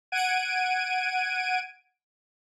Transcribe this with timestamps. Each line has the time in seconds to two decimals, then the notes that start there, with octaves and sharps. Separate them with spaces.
0.12 F#5 G#6 D7 D#7